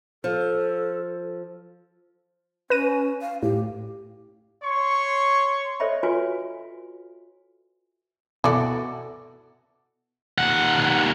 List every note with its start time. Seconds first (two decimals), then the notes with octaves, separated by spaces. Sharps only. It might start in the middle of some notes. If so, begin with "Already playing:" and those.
0.24 F3 A4
2.70 C#4 B4 A#6 D#7
3.22 F5
3.43 A2 G4
4.64 C#5 C6 C#6
5.80 A4 C5 C#5 D#5 E5 B5
6.03 F4 F#4 B4 C#5 G#5 C6
8.44 B2 E3 F#4 A4 D5
10.38 D#2 F#5